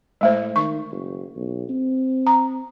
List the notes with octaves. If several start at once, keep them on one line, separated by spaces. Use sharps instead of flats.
A2 G#3 A3 C5
D#3 C#6
F#1
B1
C4
A#5